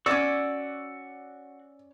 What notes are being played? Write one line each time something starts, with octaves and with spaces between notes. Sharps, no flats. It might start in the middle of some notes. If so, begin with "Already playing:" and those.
C#4 F#4 D5 D6 E6